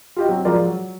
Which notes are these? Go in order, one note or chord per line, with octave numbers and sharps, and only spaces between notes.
F4 G4 D#5
F#3 C4
F3 G#3 F4 A#4 D5
F#3